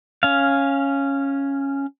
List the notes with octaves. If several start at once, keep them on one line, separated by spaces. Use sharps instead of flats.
C#4 F5